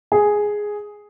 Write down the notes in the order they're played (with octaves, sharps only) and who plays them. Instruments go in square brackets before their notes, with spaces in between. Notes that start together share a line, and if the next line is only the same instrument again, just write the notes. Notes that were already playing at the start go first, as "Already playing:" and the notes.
[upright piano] G#4